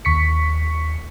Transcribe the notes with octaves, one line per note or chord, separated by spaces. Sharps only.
D#2 C#6 B6 C#7